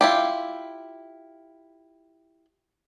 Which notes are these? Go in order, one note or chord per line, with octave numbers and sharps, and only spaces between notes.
E4 F4 G4